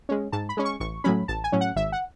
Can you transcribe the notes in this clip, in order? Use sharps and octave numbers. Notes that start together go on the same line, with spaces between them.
G#3 C#4
G#2 A5
B5
G#3 C#4
C#6
A1 C#6
A2 F#3 C#4 B5
A1 A5
G#5
A2 F#3 C#4
F#5
G#1 E5
F#5